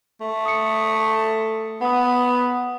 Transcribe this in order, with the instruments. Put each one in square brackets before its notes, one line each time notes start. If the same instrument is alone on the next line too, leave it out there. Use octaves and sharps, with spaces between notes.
[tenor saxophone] A3
[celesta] D#6 C#7
[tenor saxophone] B3 [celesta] F#5 D#6